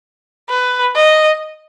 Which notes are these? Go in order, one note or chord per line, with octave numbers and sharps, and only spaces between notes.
B4
D#5